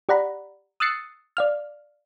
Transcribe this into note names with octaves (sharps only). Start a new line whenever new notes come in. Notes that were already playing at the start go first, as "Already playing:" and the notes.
G4 D5 F#5 A#5 B5
D#6 E6 F#6 A6 C7 C#7
D5 F5 F6